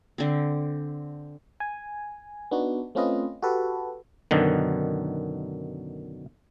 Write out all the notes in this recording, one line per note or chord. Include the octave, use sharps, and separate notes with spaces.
D3 C4
G#5
B3 D4 D#4 F#4
A3 C4 C#4 F4 B4 D#5
F#4 G4 A4 B4
F#2 B2 D3 D#3